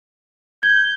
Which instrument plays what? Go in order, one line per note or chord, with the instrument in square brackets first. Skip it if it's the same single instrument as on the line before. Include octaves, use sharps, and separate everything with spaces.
[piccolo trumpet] G6 [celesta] G#6